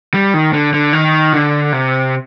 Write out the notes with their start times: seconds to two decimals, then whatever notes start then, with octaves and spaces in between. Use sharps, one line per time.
0.14 G3
0.34 D#3
0.53 D3
0.74 D3
0.93 D#3
1.33 D3
1.73 C3